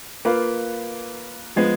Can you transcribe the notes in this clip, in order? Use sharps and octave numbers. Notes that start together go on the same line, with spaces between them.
A#3 F4 B4
F3 G#3 B3